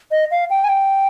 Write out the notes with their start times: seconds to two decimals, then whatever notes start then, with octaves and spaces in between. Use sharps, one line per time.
0.11 D#5
0.31 F5
0.50 G5
0.64 G#5
0.69 G5